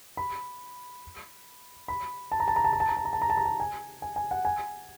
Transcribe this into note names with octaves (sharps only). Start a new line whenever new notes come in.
B5
B5
A5
A#5
A5
A#5
A5
A#5
A5
A#5
A5
A#5
A5
A#5
A5
A#5
A5
G#5
G#5
G#5
F#5
G#5